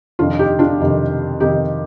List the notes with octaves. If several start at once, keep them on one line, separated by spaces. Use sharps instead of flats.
F2 C3 D#3 D4 F4
D#4 G4
D4 F4
F2 C3 D#3
F2 C3 D#3 D#4 G4